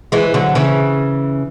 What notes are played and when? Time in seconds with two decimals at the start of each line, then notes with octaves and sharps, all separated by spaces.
0.12 E3 G#3
0.34 D3 F#3
0.55 C#3 E3